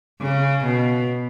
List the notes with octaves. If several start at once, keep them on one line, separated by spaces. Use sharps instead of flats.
C#3
B2